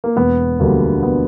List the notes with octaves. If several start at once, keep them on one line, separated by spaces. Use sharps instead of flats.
A#3
E1 B3
D2 D3 G3 A#3
B3